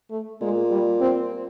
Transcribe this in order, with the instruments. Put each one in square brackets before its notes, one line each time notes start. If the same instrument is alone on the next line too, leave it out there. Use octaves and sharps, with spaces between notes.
[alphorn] A3
[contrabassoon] A#2 [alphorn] G#3
[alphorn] G3
C4